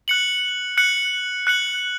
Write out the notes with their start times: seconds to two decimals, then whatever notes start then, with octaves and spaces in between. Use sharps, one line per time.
0.08 F#6 C#7 F#7
0.77 F#6 C#7 F#7
1.47 F#6 C#7 F#7